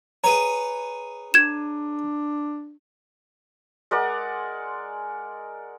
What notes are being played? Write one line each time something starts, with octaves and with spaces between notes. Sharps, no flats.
G#4 B4 C#5 A#5
D4 G#6 E7
G#3 A#4 D5 F#5